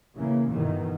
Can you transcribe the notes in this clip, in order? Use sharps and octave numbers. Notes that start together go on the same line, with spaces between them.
C#3 E3 A#3
G1 B2 D#3 E3